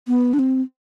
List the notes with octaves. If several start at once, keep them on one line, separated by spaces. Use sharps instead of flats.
B3
D4
C4